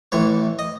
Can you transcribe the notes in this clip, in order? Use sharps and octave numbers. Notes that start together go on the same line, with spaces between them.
A1 A2 E3 C#5
D#5